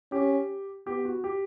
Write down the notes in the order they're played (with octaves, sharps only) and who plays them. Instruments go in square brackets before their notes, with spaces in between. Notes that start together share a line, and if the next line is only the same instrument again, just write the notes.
[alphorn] C#4 [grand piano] G4
[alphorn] B3 [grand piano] G4
[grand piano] F#4
G4